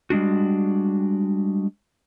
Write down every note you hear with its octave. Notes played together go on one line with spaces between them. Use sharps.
G3 G#3 D4 F#4